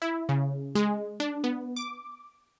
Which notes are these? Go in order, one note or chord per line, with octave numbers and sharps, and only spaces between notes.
E4
C#3
G#3
D4
B3
D6